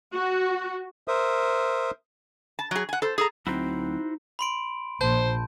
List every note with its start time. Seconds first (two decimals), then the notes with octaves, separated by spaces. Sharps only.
0.13 F#4
1.08 A#4 C5 E5 D#6
2.59 A5
2.71 F#3 G#4
2.89 F#5 G#5
3.02 A4 C5
3.18 G#4 A4 A#5
3.47 D2 F#3 C4 D#4 E4 F#4 C5
4.39 B5 C6 D7
5.01 A#1 C5 A5 G6